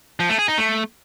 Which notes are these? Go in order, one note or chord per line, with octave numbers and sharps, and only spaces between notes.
F3
A3
G#4
D#4
A3